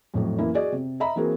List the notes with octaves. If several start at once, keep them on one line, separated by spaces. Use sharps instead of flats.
F2 A2 F#3 A3
E3 A#3 C#4 E4
F#4 G#4 D5 D#5
C3
D#5 E5 A#5 B5
E3 A#3 C4 F#4 G#4 A#4